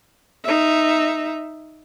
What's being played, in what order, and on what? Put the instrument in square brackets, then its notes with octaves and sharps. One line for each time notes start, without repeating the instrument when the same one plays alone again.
[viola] D#4 E5